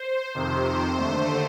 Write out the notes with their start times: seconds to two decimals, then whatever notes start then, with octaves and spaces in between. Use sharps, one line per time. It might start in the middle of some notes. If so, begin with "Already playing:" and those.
Already playing: C5
0.34 F2 C3 D#3 C5
0.97 D#2 D3 A3